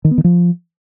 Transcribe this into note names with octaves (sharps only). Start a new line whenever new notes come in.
D#3
B3
D#3
F3